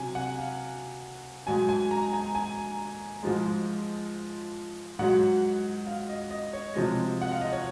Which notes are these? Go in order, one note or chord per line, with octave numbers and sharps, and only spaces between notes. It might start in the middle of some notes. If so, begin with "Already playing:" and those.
Already playing: C3 F#3 G#5
F#5
F5
G#2 F#3 G#5
G#5
A#5
G#5
G#5
G#2 F3 G#3
G#2 F#3 F#5
F5
D#5
D#5
C#5
C3 F3 G#3 D#5
F#5
F5
D#5
C#5